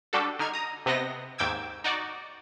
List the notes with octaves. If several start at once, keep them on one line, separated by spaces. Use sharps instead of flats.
G3 D4 F#4 A4
D3 D#4 F6 G#6
A#5 D#6
C3 B3 C4 D#5 A#6
D#2 G#2 G5 D6 E6 G#6
D#4 F#4 D5